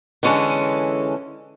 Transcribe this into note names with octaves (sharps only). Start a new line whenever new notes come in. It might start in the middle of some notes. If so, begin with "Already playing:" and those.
D3 E3 G#3 C#4 A4